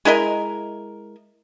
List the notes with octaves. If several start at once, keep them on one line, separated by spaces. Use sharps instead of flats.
G#3 E4 A#4 D#5